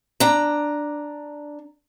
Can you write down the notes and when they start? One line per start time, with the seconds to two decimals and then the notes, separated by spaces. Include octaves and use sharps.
0.20 D4 A#5